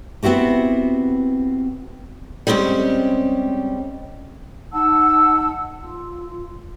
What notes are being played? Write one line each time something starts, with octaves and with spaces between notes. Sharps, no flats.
B3 C4 E4 F#4 G4
G3 G#3 C4 C#4 G4
D#4 F#5 A5 E6
F4